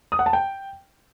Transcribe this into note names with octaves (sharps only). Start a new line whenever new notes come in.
D#6
F#5
A5
G5